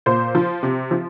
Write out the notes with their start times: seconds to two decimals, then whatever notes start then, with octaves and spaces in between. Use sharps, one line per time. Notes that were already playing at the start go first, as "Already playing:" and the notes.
0.06 A#2 C5 C6
0.35 F3
0.63 C3
0.91 F3